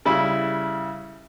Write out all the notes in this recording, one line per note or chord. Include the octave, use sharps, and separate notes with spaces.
C#3 G3 E4